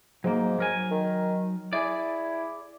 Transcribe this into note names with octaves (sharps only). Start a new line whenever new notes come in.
G#2 F#3 A#3
F#3 A#4 G#5
D#3
E4 G#4 D5